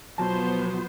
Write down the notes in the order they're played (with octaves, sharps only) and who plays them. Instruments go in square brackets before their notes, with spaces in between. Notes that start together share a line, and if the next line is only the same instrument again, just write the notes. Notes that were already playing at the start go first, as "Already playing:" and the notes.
[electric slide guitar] B2 F#3 A5 [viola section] F3 B3 C5